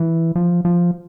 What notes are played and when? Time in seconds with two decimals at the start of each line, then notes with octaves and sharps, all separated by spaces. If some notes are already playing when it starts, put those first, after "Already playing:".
Already playing: E3
0.36 F3
0.65 F3